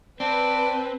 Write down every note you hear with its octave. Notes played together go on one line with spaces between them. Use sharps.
C4 B4 D5 A5